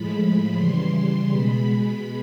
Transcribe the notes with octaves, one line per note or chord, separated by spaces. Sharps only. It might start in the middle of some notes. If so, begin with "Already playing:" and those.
Already playing: A2 F3 G#3 B5
C#3 E3 G3 C6
B2 G#3 B5